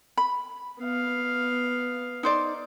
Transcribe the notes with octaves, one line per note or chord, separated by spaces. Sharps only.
B5
B3 F5
D#4 C5 D5